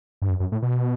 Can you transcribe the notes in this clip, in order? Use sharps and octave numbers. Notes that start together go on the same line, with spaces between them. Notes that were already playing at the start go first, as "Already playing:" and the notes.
G2
F#2
F#2
A2
B2